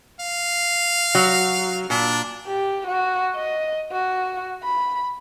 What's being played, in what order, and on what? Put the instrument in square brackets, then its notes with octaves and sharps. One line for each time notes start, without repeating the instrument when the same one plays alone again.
[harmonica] F5
[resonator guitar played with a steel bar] F#3
[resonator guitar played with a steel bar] A#2 [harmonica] D4
[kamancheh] G4
F#4
D#5
F#4
B5